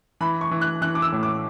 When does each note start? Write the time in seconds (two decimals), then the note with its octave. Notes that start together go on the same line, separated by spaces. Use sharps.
0.21 E3 B5
0.41 C#6
0.51 E3
0.61 F#6
0.82 E3 F#6
0.95 D6
1.02 E6
1.12 A2
1.23 D6